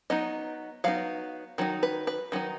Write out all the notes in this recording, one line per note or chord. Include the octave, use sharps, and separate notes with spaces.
F#3 B3 D#4 D#5
F#3 B3 D#4 F5
D#3 F#3 D#4
B4
B4
D#3 F#3 D#4